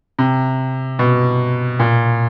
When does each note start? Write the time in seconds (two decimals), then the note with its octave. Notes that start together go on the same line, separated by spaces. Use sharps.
0.19 C3
0.99 B2
1.79 A#2